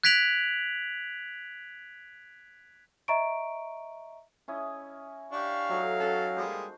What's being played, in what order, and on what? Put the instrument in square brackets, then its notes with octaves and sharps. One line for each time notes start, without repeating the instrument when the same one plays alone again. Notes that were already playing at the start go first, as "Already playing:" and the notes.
[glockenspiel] F#6 G#6 B6 D7 F7 F#7
[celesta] D#5 E5 A#5 C#6 D7
[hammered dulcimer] C#4 E4 D#5
[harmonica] D4 G4 C#6 [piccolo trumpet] F5
[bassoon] F#3 [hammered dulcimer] D#4 A4
[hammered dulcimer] C#4 F#4 [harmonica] A4
[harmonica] G3 G#3 A#3 [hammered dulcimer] C5 C6